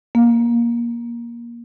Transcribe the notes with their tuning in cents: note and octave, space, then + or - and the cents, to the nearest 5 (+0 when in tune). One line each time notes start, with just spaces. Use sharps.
A#3 +15